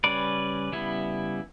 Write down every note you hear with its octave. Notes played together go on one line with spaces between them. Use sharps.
C#3 G3 C#4 B4 D5
C#3 G3 B3 E4